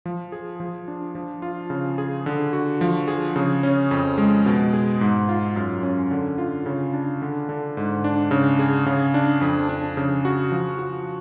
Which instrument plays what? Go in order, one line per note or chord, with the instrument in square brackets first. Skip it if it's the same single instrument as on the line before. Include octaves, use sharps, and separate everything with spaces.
[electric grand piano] F3
G#4
F3
D4
F3
F4
C#3
G#4
D3
F#4
F3
G#4
C#3
C#4
F2
G#3
B2
G#4
G#2
F4
F#2
C#4
D3
F4
C#3
D4
D3
D3
G#2
D4
C#3
G#4
C#3
D4
F2
D4
C#3
F#4
F3
F#4